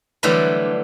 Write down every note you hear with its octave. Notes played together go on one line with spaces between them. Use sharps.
D3 E3 F#3 G3 A3